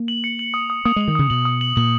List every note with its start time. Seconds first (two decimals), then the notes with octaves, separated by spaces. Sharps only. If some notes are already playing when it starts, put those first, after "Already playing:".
Already playing: A#3
0.08 F#7
0.24 C#7
0.39 F#7
0.54 D#6
0.70 D#6
0.85 A#3 D#6
0.96 G#3 F#7
1.08 D#3
1.15 C#3 D#6
1.30 B2 F#7
1.45 D#6
1.61 F#7
1.76 A#2 F#7